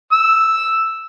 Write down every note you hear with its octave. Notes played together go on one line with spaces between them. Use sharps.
E6